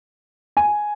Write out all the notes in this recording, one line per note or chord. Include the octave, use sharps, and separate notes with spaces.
G#5